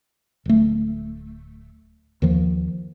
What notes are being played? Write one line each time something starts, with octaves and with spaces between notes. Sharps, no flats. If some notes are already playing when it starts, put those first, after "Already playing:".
D1 A3
D#2 D#3 F3